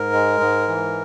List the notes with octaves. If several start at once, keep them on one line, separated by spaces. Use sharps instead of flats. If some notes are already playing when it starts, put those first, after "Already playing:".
Already playing: G#2 A#4
G#3
G#2
E3